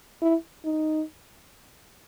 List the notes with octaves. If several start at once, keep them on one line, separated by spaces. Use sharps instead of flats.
E4
D#4